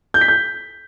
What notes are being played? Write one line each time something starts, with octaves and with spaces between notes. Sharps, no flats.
G6
B6
G6